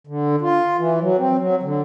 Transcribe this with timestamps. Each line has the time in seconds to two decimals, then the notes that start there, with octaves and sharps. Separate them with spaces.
0.07 D3
0.42 F4
0.78 E3
1.01 F#3
1.18 C4
1.39 F#3
1.63 D3